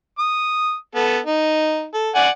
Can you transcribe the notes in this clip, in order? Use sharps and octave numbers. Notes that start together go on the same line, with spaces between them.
D#6
B3 A4
D#4
A4
D5 F#5 G#5